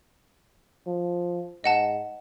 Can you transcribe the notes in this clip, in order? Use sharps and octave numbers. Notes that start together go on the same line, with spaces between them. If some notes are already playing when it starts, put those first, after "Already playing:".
F3
G#2 D#5 F#5 A5